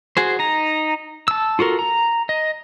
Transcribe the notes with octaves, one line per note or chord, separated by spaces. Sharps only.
F#4 G#4 C5
D#4 A#5
A5 E6
F4 F#4 A4 A#4
A#5
D#5